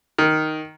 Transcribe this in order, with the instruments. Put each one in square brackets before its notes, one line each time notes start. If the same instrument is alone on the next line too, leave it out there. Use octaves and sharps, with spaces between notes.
[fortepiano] D#3